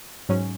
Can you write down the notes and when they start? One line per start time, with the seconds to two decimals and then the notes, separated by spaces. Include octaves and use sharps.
0.29 G#2 F#3 C#4